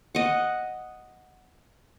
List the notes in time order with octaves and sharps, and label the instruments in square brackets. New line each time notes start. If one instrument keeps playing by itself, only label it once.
[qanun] D#5 F#5